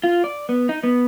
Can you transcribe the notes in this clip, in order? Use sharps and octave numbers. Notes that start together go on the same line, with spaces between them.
F4
D5
B3
D#4
B3